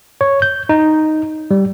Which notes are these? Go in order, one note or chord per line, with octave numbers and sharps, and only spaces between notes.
C#5
G6
D#4
G3